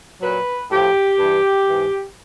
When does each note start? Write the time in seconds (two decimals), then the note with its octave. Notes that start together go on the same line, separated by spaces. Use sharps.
0.21 A#2 F#3 B4
0.69 A2 F3 G4
1.19 G2 E3
1.67 G#2 E3